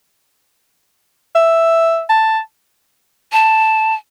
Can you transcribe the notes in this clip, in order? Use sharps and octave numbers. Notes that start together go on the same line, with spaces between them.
E5
A5
A5